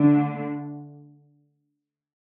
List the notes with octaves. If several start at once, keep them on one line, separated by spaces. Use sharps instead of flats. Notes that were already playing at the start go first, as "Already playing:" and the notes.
Already playing: D3 A3 D4